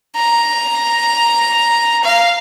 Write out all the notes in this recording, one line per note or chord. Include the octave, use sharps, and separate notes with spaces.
A#5
F5